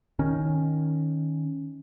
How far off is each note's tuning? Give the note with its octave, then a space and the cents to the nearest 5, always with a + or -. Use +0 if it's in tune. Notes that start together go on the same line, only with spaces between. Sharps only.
D#3 +0 C#4 +0